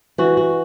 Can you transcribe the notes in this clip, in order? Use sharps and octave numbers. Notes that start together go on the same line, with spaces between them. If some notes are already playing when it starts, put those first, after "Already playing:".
E3 F#4
F#4